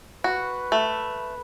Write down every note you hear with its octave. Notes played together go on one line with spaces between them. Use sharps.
F#4 B4
A3